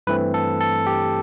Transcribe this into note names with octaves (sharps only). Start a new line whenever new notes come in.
G2 E3 A3 C4 B4
A4
A4
G4